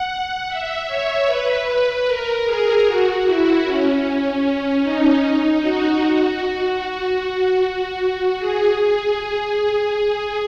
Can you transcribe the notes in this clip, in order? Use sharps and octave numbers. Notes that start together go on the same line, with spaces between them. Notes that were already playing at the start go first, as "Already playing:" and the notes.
Already playing: F#5
E5
C#5
B4
A#4
G#4
F#4
E4
C#4
C#4
D#4
F#4
F#4
F#4
G#4
G#4